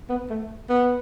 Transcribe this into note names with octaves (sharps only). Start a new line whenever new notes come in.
B3
A3
B3